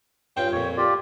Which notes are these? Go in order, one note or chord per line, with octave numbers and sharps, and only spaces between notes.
G2 C#4 F4 G5
F2 A#2 C#5
F4 G4 D5